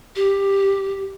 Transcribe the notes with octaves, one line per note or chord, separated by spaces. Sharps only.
G4